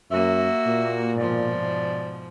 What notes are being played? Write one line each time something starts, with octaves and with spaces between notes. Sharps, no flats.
F#2 A#3 F#4 E5
A#2
G#2 B2 F3 D5